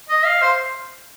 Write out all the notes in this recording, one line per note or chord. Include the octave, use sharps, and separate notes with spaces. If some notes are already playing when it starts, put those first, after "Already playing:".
D#5
F5
C5